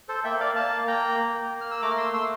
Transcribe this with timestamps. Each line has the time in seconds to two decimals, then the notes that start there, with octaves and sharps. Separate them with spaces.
0.09 A4 C5
0.24 A#3 E5 G5
0.40 D5 F5
0.56 A#3 F5 A5
0.87 A#3 G5 A#5
1.19 A#3
1.51 A#3
1.61 F6
1.71 E6
1.82 A3 A#5 D6
1.91 F6
1.97 C6 E6
2.14 A3 C6 E6